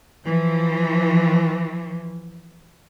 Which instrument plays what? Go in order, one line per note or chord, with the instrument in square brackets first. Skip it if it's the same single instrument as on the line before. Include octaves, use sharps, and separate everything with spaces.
[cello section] E3 F3